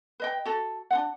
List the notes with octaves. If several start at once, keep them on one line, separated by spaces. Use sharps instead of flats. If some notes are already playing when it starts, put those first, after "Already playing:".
B4 D#5 G5
F#4 A4
D4 F4 F#5